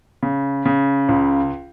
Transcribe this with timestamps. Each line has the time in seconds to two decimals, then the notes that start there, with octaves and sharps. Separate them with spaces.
0.23 C#3
0.66 C#3
1.09 C#2